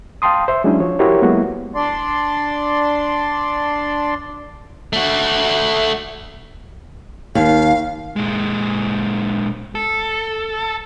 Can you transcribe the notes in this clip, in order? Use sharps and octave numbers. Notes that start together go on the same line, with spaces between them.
F5 G5 A5 C6 D#6
C5 E5
F#3 G#3 C#4 D4 E4
F3 C#5
E4 F#4 G4 A#4 C5 C#5
F#3 G#3 A#3 B3 E4 F#4
D4 D5 C6
A3 F#4
D#2 F5
A#2 G#3
A4